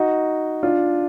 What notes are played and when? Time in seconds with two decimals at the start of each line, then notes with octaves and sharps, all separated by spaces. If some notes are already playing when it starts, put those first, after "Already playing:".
Already playing: D#4 F#4
0.63 D4 F4